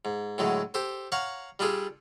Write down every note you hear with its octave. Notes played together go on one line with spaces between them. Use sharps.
G#2
A2 D3 F#3 G#3
G4 A4 C5
C#5 F5 F#5 A#5 C#6
G3 D4 F4 G#4 A4